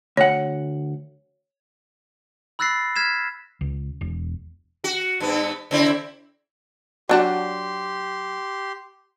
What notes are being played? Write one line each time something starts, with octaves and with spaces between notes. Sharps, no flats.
D2 C#5 F#5
B5 E6 F#6 A6 A#6 C7
F6 G#6 B6 E7
C#2
E1
F#4
G2 B3
C#3 C4 E4
F#3 D4 F#4 G4 C6